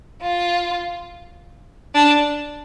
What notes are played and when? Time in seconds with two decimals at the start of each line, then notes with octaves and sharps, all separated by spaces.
0.22 F4
1.94 D4